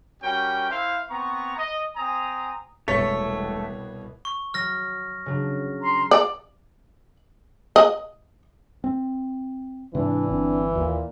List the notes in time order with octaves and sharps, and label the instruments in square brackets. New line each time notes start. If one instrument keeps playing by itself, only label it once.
[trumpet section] G3 C#4 F#4 A#4 G5
E4 C5 E5 F5
B3 C4 A#5 C#6
D#5
C4 G#5 A#5 D#6
[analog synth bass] E1 [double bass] C2 B2 [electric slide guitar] A3 [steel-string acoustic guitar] C#5
[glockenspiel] C#6
[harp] F#3 [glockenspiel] F6 A#6
[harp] C#3 F#3 D4
[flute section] A#5 C6
[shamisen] D5
D#5
[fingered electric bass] C4
[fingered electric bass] G#2 C3 [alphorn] E3 [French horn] D4
[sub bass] G1 [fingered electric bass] C4 [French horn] D4
[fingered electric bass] D#2 [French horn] A#2